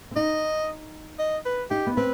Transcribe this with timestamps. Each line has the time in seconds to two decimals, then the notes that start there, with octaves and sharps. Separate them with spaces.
0.11 C4
0.16 D#4 D#5
1.19 D#5
1.45 B4
1.71 D#4 G4
1.87 B3
1.97 C4 B4